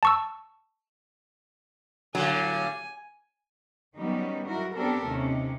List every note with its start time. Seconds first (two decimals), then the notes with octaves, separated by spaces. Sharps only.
0.03 A5 C#6 E6
2.15 A2 D3 F#3 G3 G#5
3.97 D#3 F#3 G3 B3 C#4 D#4
4.47 E4 F#4 A#4
4.76 B3 C4 D4 G4 A4 A#4
5.07 D#2 C3 C#4 D#4